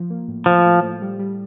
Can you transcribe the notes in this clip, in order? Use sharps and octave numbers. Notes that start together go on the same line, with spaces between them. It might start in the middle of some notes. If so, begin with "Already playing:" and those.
Already playing: F3
A#3
A2
A2 F3
A2
A2
G3
G3